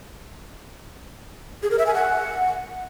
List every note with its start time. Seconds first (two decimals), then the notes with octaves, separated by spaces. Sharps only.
1.63 G#4
1.71 A#4
1.79 E5
1.87 G#5
1.94 F#5